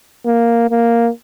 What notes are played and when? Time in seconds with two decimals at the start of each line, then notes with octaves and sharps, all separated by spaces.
0.26 A#3
0.70 A#3